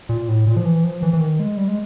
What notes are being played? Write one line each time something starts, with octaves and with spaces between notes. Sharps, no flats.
A#2
A2
A#2
F3
E3
F3
E3
E3
D#3
G#3
G3
G#3